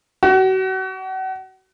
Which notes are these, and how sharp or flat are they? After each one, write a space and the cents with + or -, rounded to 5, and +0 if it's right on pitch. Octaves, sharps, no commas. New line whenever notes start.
F#4 +35